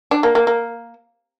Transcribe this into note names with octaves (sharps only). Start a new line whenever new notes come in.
D4
A#3
A#3
A#3